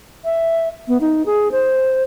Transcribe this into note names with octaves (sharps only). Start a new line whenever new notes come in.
E5
B3
D#4
G#4
C5